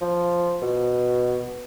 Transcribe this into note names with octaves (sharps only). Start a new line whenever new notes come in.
F3
B2